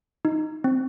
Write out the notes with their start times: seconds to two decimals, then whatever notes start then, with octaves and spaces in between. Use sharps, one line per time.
0.25 D#4
0.64 C4